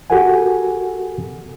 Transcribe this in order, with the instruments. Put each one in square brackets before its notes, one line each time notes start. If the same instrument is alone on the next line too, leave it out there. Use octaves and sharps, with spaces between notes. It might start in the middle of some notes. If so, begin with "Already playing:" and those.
[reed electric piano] F#4 G4 A4 A#4 F#5 G#5